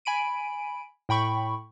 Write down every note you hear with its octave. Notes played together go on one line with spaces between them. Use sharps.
G#5 B5 D7 D#7
A2 G5 B5 C#6